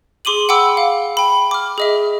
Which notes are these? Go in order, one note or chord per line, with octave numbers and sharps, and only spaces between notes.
G#4 C6 D6 D#7 F#7
F#5 G5 B5 D6 E6
F5
G5 B5
D6 F6
G#4 D#5 E5